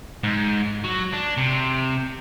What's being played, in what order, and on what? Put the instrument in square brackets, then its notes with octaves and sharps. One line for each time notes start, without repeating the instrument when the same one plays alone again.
[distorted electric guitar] G#2
F#3
D4
C3